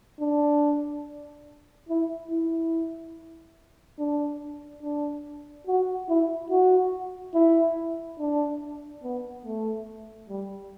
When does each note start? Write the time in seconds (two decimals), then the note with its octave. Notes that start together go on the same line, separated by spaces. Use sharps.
0.20 D4
1.89 E4
2.31 E4
3.99 D4
4.83 D4
5.67 F#4
6.09 E4
6.50 F#4
7.34 E4
8.19 D4
9.03 B3
9.45 A3
10.29 G3